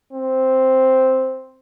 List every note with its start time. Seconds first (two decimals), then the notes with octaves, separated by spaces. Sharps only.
0.13 C4